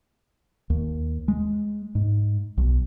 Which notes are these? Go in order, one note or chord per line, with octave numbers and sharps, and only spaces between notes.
D#2
G#3
G#2
B1